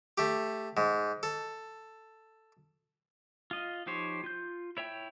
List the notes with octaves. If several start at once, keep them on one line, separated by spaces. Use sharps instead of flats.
A3 G4
G#2
A4
F4 D#5
F3 D#4 G4 C5 C#5
F4 G6
E4 C#5 E5 G5